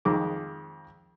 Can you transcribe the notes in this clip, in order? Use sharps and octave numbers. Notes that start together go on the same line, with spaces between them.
F2 D#3 G#3 D6